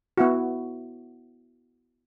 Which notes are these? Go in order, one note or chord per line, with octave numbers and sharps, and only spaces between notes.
B3 E4 F#4